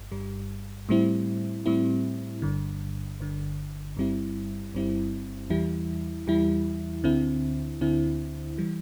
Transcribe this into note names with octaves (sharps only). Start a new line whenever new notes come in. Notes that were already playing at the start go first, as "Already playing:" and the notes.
Already playing: G1 G2
G1 G2 G3
A2 G3 C4 E4
A2 G3 C4 E4
G1 G2 D3
G1 G2 D3
G1 G2 G3 C4 E4
G1 G2 G3 C4 E4
E2 E3 G3 E4
E2 E3 G3 E4
D2 D3 C4 E4
D2 D3 C4 E4
E3 G3